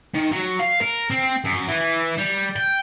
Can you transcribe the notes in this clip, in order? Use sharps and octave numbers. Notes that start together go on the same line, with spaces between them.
D#3
F#3
F5
A#4
C4
F#2
E3
G3
G5